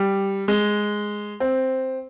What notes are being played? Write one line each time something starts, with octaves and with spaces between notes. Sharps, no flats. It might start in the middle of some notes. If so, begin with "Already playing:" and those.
Already playing: G3
G#3
C4